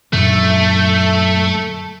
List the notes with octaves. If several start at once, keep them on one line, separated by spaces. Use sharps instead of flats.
F#2 A#2 D3 A3